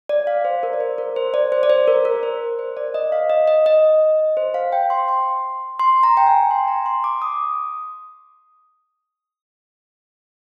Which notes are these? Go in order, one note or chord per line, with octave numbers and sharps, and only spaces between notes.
D5
F5
C5
A#4
D5
C5
A#4
C5
D5
C5
D5
C5
A#4
A#4
C5
C5
D5
D#5
F5
D#5
D#5
D#5
C5
F5
G5
C6
C6
C6
A#5
G5
G#5
C6
A#5
C6
D6
D#6